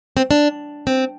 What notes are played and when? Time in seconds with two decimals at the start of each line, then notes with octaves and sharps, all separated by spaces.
0.17 C4
0.31 D4
0.87 C4